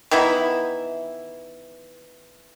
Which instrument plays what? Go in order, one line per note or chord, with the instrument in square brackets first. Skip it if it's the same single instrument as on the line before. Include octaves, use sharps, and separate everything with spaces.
[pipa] D#3 E3 B3 E4